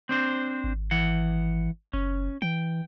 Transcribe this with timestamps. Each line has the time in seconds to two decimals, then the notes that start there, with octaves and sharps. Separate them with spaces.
0.09 C4 D4 C5
0.64 G#1
0.91 E3 F#5
1.93 F#1 C#4
2.42 E3 G5